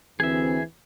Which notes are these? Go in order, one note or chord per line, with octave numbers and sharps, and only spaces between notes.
D2 E3 C4 G#4 E5